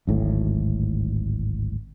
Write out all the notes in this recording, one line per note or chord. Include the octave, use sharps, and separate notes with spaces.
D1 G#1 A2